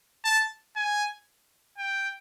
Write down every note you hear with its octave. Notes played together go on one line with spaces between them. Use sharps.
A5
G#5
G5